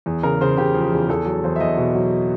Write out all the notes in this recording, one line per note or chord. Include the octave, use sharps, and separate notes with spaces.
E2
C#3 A#4
C#3 C5
C#3 G4
F3
E2
E2 A4
F#3
E2 C5
E5
E2 D#5
B2
F#3